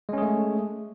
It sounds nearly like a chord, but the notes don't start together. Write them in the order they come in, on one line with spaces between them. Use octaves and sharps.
G#3 C#4 G#4 A3